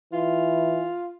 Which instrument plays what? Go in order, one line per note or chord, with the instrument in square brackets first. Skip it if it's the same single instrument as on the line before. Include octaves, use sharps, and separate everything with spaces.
[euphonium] E3 [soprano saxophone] F4